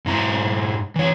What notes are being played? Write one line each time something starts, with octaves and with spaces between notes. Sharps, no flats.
G#2 E4 A#5
E3 C#5